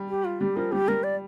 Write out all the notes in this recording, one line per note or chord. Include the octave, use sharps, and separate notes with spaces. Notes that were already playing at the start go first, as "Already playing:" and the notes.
Already playing: G3
G4
F4
G3 G4
F3 A#4
G3 G4
G3 A#4
D5